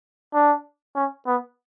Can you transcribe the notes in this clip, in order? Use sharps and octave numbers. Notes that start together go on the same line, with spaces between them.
D4
C#4
B3